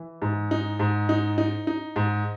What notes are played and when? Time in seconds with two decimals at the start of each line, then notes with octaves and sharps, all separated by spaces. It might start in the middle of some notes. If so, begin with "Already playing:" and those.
Already playing: E3
0.22 G#2
0.51 D#4
0.80 G#2
1.09 D#4
1.38 D#4
1.67 D#4
1.96 G#2